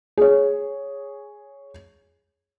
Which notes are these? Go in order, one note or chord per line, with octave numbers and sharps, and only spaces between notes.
G#4 C#5